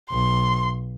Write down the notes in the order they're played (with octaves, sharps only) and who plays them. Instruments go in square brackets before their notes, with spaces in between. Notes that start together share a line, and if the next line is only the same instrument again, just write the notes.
[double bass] B1 [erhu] C6